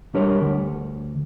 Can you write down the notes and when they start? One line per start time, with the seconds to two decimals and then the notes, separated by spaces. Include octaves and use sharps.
0.14 G3 D4 A#4 C#5
0.41 D2